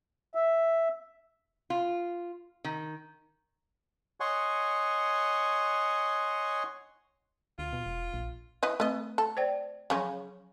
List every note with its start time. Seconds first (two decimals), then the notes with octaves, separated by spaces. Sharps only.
0.35 E5
1.70 F4
2.64 D#3
4.20 C#5 D#5 F#5 G#5 C6 C#6
7.59 D2 F4
7.73 B2
7.86 E1
8.14 A#1
8.63 E3 B4 D#5
8.80 A3 C4 B4 D#5
9.18 A4
9.37 C5 D5 G5
9.90 C#3 F3 F#3 C#4 C6